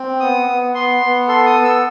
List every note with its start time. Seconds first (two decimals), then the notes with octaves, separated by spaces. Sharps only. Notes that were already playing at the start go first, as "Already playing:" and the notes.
Already playing: C4
0.20 B3 D#6
0.47 B3
0.74 B3 C6
1.02 B3
1.28 A4 C6
1.46 D#6
1.55 B3
1.64 E6